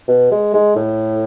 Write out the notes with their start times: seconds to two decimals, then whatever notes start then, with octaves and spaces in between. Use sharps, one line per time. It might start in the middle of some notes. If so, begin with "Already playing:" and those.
0.08 B2
0.32 G#3
0.54 G#3
0.76 A2